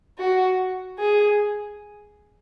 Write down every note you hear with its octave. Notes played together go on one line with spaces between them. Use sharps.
F#4
G#4